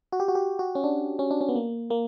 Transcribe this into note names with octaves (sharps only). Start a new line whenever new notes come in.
F#4
G4
F#4
G4
F#4
C#4
D4
C#4
D4
C#4
B3
A#3
A#3